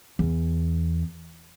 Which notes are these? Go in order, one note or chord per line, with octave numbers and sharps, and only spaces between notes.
E2